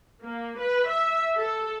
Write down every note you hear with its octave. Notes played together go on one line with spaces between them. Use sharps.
A#3
B4
E5
A4